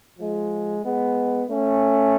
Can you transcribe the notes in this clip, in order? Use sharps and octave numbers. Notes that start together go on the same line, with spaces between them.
F3 G#3
G#3 B3
A3 C#4